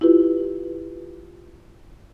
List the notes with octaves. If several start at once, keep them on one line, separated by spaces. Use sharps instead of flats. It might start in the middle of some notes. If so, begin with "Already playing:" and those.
E4 F4 G4 B4